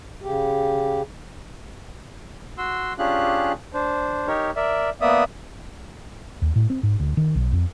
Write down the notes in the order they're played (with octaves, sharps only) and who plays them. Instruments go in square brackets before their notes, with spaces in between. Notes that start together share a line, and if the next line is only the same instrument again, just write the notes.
[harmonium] C#3 G4
[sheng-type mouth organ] F#4 C6 E6
C#4 D4 F4 G4 G#4 F#6
D4 C5
D#4 G4 A#4 C#5
A#4 D5 E5
A#3 B3 D5 E5 D#6
[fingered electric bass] D#2
A2
C4
G#2
D2
D#3
B1
F2